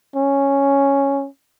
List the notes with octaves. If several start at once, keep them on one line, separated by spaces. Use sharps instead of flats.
C#4